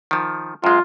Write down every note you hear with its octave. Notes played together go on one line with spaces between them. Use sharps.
D#3 F3
F#2 G#3 F4